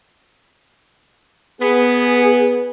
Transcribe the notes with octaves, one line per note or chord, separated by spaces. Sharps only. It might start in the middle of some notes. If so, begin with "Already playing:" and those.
B3 G#4